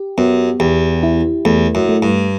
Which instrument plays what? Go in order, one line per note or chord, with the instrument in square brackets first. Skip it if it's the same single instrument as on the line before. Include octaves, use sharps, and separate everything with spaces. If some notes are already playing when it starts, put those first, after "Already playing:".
Already playing: [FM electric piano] G4
[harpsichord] F#2 [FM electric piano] B3
[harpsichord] E2 [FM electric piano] G4
[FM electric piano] E4
[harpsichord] E2 [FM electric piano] A3
[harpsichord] F#2
[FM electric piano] A3
[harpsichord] G2